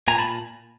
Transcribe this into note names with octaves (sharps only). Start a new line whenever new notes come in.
A#2 G#5 A#5
A5 B5